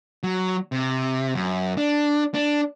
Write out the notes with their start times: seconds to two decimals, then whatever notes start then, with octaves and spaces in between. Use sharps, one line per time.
0.23 F#3
0.72 C3
1.35 F#2
1.78 D4
2.34 D4